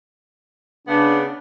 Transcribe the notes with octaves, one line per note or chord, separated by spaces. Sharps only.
C#3 B3 D4